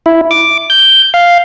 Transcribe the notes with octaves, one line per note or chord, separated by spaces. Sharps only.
E4
D6
G6
F5